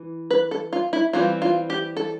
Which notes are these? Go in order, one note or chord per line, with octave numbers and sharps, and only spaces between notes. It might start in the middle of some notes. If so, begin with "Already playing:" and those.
Already playing: E3
B4
A4
F4
E4
E3 G3 C4 F4
F4
G4
A4